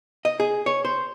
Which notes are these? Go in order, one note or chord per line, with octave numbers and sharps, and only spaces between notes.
D#5
G#4
C#5
C5